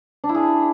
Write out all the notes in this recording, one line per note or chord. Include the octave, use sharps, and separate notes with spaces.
D4
E4
G#4